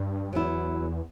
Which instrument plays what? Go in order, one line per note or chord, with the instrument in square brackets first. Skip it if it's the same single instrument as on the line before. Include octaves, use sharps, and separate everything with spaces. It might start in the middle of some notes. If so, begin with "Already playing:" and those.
Already playing: [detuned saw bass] G2
[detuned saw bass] E2 [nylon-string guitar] F#3 B3 E4